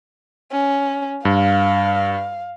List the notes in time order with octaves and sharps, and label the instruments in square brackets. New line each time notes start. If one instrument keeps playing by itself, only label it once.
[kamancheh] C#4
[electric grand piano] G2 [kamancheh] F5